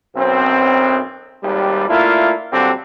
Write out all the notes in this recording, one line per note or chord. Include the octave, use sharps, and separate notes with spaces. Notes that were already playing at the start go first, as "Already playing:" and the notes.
B1 F#2 B2 C4
G#1 D#2 G3
A3 A#3 D4 E4 F4
A#2 D3 F#3 G3 C4